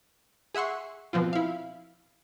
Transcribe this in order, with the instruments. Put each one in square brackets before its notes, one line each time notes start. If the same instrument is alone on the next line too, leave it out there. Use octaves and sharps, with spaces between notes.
[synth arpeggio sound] G#4 E5 F#5 C6 C#6
B2 F3 C4 F4
E4 F5